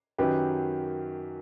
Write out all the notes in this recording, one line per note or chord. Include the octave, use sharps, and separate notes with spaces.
F#2 D#3 F#3 G4 B4